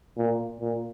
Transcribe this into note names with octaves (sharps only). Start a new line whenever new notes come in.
A#2
A#2